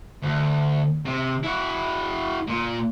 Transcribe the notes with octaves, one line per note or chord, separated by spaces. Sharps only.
D2
C3
E4 F#4
A#2